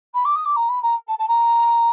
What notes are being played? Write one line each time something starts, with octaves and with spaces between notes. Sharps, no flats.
B5
D6
D#6
D6
A#5
B5
A#5
A5
A5
A#5